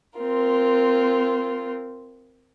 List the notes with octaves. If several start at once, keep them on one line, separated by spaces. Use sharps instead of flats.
C4 F4 A#4